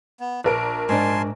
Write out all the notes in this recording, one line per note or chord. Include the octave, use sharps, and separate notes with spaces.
B3
A#1 D4 A#4 D7
G#2 D4 G#5 A5 C6